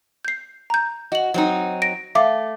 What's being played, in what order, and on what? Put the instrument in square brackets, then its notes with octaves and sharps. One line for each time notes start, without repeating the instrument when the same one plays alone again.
[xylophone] G6 C7
A#5 G6
[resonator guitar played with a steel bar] F#4 [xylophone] D#5 F#7
[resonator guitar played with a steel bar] F#3 C4 D#4
[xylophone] A#6 D7
[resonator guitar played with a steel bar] A3 [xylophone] E5 F5 D6